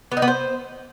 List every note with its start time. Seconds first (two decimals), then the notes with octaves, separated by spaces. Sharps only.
0.12 B3
0.17 D#4
0.22 B3
0.28 C5